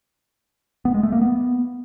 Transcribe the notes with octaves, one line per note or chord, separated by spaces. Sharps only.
B3
G#3
A3
A#3
B3